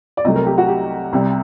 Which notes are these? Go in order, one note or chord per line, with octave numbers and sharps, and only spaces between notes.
D5
C2 C3 F#3 A3 D#5
A#4
G4
F#4
G4
C2 C3 G3